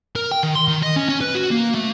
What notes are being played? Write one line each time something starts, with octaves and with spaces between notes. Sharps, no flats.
A#4
G5
D#3
C6
D#3
D#5
C#4
C#4
B4
F#4
A#3
A3